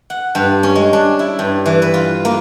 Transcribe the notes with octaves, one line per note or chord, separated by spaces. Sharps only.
F#5
G2
C#4
G#3
D4
E4
G2
E3
B4
F4
A#3